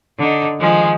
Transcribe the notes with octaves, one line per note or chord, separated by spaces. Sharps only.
D3 D4 D#4
D#3 F3 G#3